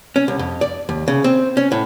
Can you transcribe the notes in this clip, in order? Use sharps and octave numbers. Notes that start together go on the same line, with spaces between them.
C#4
C2
F2
D5
D#2
C#3
C4
C#4
A2